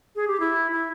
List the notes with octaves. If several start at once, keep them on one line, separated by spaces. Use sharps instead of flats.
G#4
G4
E4
E4